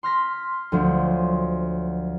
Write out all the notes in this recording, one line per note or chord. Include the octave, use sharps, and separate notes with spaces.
C6 F6 A#6 B6
D2 F3 F#3